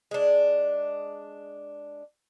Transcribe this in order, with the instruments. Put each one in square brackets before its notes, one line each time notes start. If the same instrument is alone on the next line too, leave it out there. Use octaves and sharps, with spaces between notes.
[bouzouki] G#3 D4